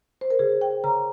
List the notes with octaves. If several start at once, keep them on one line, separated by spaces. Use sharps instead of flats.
C5
A#4
C#3 G#4
G5
C#3 A#5